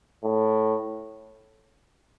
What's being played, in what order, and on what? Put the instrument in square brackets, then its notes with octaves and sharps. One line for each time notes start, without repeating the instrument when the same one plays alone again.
[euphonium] A2